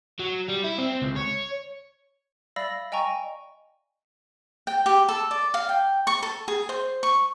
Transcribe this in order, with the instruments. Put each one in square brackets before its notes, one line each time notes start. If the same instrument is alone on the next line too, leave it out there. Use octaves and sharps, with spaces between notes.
[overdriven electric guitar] F#3
G3
E4
C4
C#2
C#5
[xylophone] D5 E5 F5 B5 E6 A#6
D#5 G5 G#5 A#5 C#6
[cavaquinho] G5
G4
A4
D5
F5
G5
C#6
A4
G#4
C5
C#6